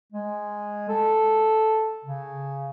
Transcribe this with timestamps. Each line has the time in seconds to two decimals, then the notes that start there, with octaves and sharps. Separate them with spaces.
0.12 G#3
0.89 A4
2.05 C#3